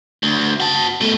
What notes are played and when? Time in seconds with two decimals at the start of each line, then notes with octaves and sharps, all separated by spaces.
0.23 D2
0.60 F#4 A5
1.01 B2 A3